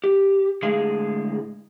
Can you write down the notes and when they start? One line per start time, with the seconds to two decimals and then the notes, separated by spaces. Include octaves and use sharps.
0.04 G4
0.62 A2 D3 G#3 G#4 F5